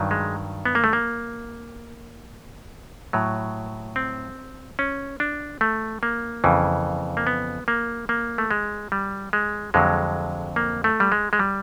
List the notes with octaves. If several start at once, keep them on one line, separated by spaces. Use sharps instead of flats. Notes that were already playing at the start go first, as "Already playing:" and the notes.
Already playing: G2 D#3 F#3
G#3
B3
A#3
A3
A#3
A2 F#3
C4
C#4
D4
A3
A#3
F2 C#3 E3
A#3
B3
A#3
A#3
A3
G#3
G3
G#3
F2 D3 F#3 G#3
A#3
A3
G3
G#3
G#3
G3